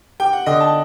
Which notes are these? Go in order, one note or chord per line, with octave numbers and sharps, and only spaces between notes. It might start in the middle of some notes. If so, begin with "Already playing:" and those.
G4 G5
F#5
D3 D#5
A5